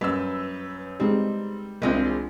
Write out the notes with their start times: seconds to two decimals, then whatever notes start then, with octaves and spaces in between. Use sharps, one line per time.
0.01 F#2 G3 A#3 B4 E6
1.00 G3 G#3 C4 D#4 G4
1.82 C2 E3 G#3 A#3 C4 D4 F4